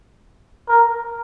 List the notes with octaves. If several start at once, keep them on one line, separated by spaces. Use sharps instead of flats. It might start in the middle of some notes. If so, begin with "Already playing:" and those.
A#4